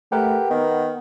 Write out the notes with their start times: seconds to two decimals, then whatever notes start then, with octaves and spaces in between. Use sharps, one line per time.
0.12 A3 G4 A#4 B4 F#5
0.50 D#3 B3